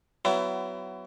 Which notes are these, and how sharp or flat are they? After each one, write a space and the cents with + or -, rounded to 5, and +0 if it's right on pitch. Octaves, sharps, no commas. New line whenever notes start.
F#3 +30 B3 +35 E4 +25